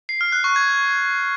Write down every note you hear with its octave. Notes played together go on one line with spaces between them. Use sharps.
C7
F6
F#6
C#6
G#6